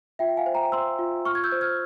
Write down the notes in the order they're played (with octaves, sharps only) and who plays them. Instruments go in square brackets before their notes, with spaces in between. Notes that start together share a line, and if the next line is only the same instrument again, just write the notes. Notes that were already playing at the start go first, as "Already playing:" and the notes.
[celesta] F4 E5 G5
F5 G#5
C5
G5 A#5
C5 C6 E6
F4
F4 C#6 F6
G#6
E6 G6
C5
F6 G#6